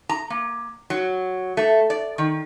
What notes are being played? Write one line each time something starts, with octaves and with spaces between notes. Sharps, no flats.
A#5
A#3
F#3
A3
D5
D#3